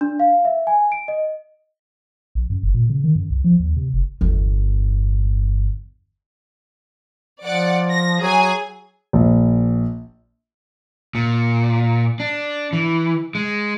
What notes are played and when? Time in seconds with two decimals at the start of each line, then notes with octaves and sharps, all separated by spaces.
0.01 D4
0.20 F5
0.45 E5
0.67 G#5
0.92 D7
1.08 D#5
2.35 A#1
2.50 F#2
2.63 F#1
2.74 A#2
2.90 C#3
3.04 D#3
3.16 F#2
3.30 C2
3.44 F3
3.60 D#2
3.77 C3
3.94 F1
4.21 G1 E2
7.44 F3 D5 F#5
7.90 A#6
8.21 F#3 G#4 G#5
9.13 A#1
11.15 A#2
12.20 D4
12.73 E3
13.35 G#3